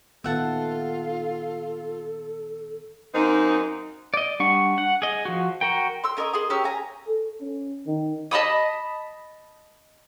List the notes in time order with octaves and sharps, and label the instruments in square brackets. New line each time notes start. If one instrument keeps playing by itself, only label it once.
[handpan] A#2 D#3 B3 [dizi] F4 [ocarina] A4 [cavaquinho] E5 F#5 A5
[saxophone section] F#2 A#3 C4 D#4
[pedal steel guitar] D5 D#5
G3 D4 F#5 C#6
F#5
G#4 D#5
F3 F#4
F#4 A#4 G5
[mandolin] C6 E6
C#4 A#4 C#5 D#5
G#4 C6 D#6
C#4 G4 A#4 E6
G#5 A#5
[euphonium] A4
C#4
D#3
[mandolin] D#5 A5 B5 D#6